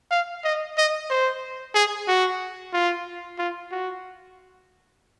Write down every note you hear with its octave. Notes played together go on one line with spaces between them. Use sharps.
F5
D#5
D#5
C5
G#4
F#4
F4
F4
F#4